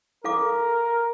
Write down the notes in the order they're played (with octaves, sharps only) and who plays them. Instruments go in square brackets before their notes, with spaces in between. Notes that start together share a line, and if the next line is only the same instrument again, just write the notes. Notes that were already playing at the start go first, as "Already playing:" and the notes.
[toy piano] A4 F5 D6 [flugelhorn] A#4